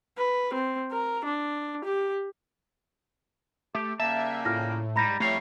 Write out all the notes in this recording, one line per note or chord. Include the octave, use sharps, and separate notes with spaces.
B4
C4
A#4
D4
G4
A3 G4
C#3 G3 A#3 E5 A5
A2 F4 F6 A#6
G#2 G3 A#5 B5 A#6
F2 G3 A3 E4 C#5 F5